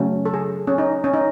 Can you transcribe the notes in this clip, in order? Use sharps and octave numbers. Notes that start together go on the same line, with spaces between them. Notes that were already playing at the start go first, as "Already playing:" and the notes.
Already playing: C#3 F#3 A3 C#4
A4
G#4
C#4
D#4
C#4
D#4